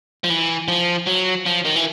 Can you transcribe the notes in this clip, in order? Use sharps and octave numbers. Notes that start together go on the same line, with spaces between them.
F3
E3
F3
F#3
F3
D#3
E3